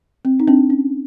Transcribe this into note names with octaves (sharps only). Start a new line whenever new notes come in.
C4
D#4
C4 D4
C#4